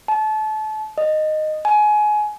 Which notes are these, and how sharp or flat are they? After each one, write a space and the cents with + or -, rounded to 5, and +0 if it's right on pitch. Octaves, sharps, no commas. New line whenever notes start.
A5 -30
D#5 -10
G#5 +25